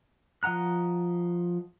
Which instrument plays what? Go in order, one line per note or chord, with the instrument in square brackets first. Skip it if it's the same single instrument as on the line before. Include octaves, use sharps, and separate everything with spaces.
[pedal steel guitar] F3 D#5 F#5 A#5 F#6